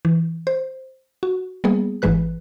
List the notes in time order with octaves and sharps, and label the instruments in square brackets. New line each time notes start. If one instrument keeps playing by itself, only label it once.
[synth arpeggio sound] E3
C5
F#4
G3 A#3 B3 G#4
G#1 G#2 E3 G#3 B4 F#6